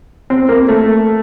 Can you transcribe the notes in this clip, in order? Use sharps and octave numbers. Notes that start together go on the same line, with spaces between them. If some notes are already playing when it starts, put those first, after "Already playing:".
C4
A#3
A3